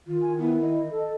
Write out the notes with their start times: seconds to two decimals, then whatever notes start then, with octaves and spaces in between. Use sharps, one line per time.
0.07 D#3 F4
0.22 G#5
0.38 B3 E4
0.61 D#5
0.91 A4